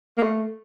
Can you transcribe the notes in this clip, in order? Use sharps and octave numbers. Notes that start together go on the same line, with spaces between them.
A#3
A3